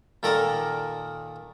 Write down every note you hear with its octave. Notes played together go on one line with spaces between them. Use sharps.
A#2 D#3 A4 A#4 D5 D#6